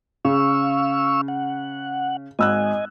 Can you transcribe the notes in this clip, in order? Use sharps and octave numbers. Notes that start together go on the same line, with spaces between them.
C#3 F5 C#6 E6
F#5
G#1 D#5 G#5 E6 F#6